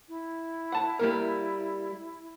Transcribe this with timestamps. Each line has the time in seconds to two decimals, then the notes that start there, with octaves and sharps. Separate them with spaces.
0.09 E4
0.72 F#5 A5
0.99 G3 A#3 A#4